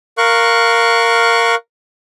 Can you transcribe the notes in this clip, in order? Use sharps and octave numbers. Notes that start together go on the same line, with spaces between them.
A#4 F5 C#6 F#6